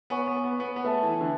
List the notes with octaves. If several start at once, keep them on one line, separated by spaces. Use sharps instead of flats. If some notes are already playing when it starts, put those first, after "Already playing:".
B3 C#5 G#5 C#6
B3
B3
B3
B3
A3 B4 E5 A5
E3
E3
D3